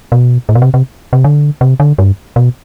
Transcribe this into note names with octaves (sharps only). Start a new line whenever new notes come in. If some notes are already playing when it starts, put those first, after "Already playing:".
B2
A2
B2
C3
C3
C3
D3
C3
D3
G2
B2